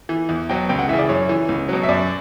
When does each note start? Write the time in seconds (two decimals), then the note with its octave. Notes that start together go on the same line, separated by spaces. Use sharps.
0.09 E3
0.29 E2
0.49 B2 F#3 G5
0.69 C#2 G5
0.79 F#5
0.89 E3 E5
0.93 C#3
0.99 D5
1.09 F#2 C#5
1.29 E3
1.49 C#2
1.69 B2 F#3
1.83 E5
1.89 F#2 D5